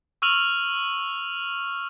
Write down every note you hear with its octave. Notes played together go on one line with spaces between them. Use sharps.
C#6 E6 F6 D#7 F7 F#7